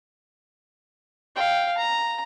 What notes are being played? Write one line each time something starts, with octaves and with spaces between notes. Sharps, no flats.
F5 G5
A#5